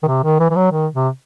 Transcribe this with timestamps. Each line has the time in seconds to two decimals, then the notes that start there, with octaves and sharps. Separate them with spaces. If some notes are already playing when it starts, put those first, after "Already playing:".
0.03 D#3
0.08 C3
0.24 D#3
0.40 E3
0.50 E3
0.56 F#3
0.72 D#3
0.94 C3